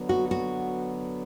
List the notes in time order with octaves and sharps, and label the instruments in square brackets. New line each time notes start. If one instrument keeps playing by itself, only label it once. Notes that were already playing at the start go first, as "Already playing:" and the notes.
Already playing: [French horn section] D3 F#3 B3
[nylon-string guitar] F#4
F#4